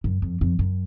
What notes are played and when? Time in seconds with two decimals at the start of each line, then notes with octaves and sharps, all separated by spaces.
0.04 F#2
0.22 F2
0.41 F2
0.59 F#2